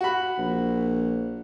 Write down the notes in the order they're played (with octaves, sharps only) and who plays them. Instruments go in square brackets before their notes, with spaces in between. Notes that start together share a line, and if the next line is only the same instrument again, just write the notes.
[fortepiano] F#4 B5
[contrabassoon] A#1